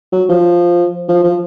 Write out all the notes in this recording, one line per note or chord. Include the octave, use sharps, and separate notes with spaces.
F#3
F3
F3
F3